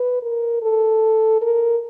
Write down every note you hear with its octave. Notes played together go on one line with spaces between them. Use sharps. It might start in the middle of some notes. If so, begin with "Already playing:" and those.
Already playing: B4
A#4
A4
A#4